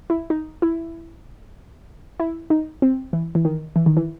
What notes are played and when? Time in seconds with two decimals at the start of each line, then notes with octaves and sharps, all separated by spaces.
0.10 E4
0.30 D#4
0.62 E4
2.20 E4
2.50 D#4
2.82 C4
3.13 E3
3.35 E3
3.45 D#3
3.76 E3
3.86 D#3
3.97 E3